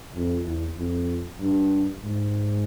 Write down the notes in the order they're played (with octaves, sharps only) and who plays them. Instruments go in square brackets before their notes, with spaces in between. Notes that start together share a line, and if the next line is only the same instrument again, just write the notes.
[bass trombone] F2
E2
F2
G2
G#2